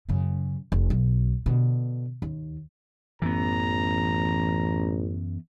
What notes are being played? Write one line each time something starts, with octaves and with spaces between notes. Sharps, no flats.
F#2 C#3
F1
B1
B2 D3
D#2
A1 F#2 E3 B3 A#5